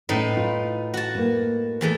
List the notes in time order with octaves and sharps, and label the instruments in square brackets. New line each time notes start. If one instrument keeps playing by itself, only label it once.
[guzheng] A2 D#4 B4 [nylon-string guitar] C#4 E4
[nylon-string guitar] F4
[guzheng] F#4 A5
[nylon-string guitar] A#3 B4
[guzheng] E2 E3 A3